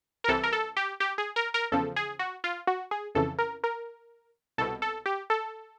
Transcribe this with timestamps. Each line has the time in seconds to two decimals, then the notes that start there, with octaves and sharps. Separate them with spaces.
0.24 A#4
0.28 C2 C3 E3 A4
0.44 A#4
0.53 A4
0.77 G4
1.00 G4
1.18 G#4
1.36 A#4
1.54 A#4
1.72 E2 C#3 F3 A4
1.96 G#4
2.19 F#4
2.44 F4
2.67 F#4
2.91 G#4
3.15 F2 C#3 E3 A4
3.39 A#4
3.64 A#4
4.58 C2 B2 A4
4.82 A4
5.06 G4
5.30 A4